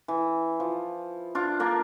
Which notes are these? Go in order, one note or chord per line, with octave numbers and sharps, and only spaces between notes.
E3
F3
D4 F4
A#3 D4